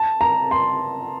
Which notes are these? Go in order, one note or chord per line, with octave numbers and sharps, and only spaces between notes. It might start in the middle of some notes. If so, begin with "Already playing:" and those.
Already playing: A5
A#5
C6